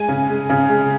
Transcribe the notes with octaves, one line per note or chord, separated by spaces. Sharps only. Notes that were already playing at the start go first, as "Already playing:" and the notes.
Already playing: G#3 G#5
C#3
G#3
C#3
G#3